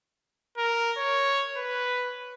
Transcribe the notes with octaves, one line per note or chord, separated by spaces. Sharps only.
A#4
C#5
B4